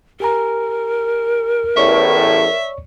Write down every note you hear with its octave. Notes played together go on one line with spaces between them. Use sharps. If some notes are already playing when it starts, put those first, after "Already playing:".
G4 A#4 G#5 A#5
A1 E2 A2 C#5 D5 E5 C#6